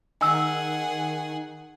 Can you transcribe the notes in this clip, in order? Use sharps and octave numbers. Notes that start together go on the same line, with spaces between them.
D#3 G#4 F#5 G#5 E6